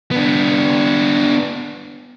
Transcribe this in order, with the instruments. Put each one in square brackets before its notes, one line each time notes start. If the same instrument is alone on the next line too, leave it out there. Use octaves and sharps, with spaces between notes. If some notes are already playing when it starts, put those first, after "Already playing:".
[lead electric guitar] B3 D4